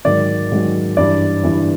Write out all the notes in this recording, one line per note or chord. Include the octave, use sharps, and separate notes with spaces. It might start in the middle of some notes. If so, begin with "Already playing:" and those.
G#2 D#3 F#3 D5
G#2 D#3 F#3
G2 E3 D5
G2 E3